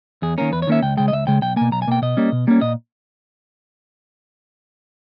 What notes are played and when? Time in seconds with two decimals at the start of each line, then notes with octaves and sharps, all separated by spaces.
0.22 E2 G#4
0.38 D#3 A#3 C#4 A#4
0.52 E2 B4
0.62 C#5
0.67 D#3 A#3 C#4 E5
0.82 C#2 G5
0.97 C#3 G#3 G5
1.08 D#5
1.12 C#2 E5
1.27 C#3 G#3 G5
1.42 B1 G5
1.56 B2 A#3 G#5
1.72 B1 A#5
1.82 G#5
1.87 B2 A#3 G5
2.02 B2 D#5
2.17 G3 A#3 C#4
2.32 B2
2.47 G3 A#3 C#4
2.61 A#2 D#5